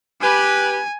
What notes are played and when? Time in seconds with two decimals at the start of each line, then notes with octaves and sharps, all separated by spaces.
0.22 G4 B4 G#5